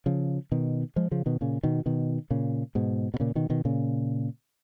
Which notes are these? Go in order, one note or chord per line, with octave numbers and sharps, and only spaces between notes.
C#3 F3
B2 D#3
F3 G#3
C#3 F3
B2 D#3
A#2 C#3
B2 D#3
B2 D#3
A#2 C#3
G#2 B2
B2
A#2 C#3
B2 D#3
B2 D#3
A#2 C#3